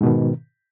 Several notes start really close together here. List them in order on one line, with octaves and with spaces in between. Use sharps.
G#2 B2 D#3